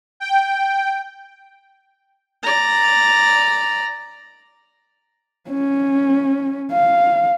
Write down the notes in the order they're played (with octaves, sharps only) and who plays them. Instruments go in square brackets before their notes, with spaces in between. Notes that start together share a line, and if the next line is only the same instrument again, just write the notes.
[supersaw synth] G5
[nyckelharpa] D5 A#5
[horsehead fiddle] C#4
F5